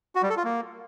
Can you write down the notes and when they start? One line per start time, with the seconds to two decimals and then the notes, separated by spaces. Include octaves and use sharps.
0.15 F#4
0.23 G3
0.30 A4
0.37 F4
0.44 A#3